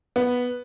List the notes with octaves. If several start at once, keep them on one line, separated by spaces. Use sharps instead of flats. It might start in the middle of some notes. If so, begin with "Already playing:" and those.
B3